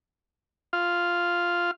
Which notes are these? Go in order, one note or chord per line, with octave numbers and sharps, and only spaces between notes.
F4